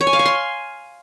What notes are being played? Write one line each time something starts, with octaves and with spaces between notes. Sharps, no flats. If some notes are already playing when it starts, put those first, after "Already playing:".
C#5
G#5
F5
G#5
C6